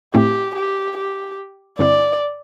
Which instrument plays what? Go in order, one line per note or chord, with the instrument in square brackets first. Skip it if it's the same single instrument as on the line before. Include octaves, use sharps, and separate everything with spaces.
[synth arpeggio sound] A2 A3 C4 E4 [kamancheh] G4
[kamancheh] G4
G4
[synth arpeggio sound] G2 D3 C4 E4 [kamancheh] D5